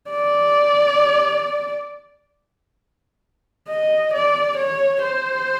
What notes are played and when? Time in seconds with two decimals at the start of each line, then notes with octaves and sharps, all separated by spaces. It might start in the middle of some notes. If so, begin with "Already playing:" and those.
0.10 D5
3.69 D#5
4.13 D5
4.57 C#5
5.03 C5